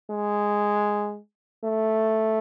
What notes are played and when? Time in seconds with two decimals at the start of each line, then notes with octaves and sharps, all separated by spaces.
0.11 G#3
1.65 A3